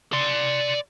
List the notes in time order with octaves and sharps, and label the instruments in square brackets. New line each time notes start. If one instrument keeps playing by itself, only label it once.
[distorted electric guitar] D5 C6